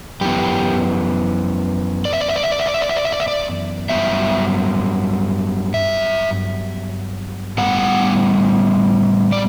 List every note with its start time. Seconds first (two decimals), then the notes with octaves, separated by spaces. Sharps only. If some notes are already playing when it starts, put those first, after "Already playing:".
0.21 F#2 E3 B3 G4
2.05 D5
2.13 E5
2.21 D5
2.28 E5
2.36 D5
2.43 E5
2.52 D5
2.59 E5
2.66 D5
2.74 E5
2.81 D5
2.89 E5
2.97 D5
3.05 E5
3.12 D5
3.20 E5
3.28 D5
3.89 G2 F#3 B3 E5
5.74 E5
7.58 A2 G3 B3 F#5
9.32 D5